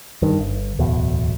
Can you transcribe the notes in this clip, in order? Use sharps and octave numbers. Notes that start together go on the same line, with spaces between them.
G2 D#3
G1
D1 E2 B2